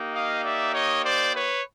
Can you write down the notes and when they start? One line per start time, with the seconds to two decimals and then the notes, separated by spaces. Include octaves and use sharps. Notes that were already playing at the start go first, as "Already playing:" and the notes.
Already playing: A#3 D#4 G4
0.13 D#5 F5
0.44 D5 E5
0.74 C#5 D#5
1.04 C5 D5
1.35 B4 C#5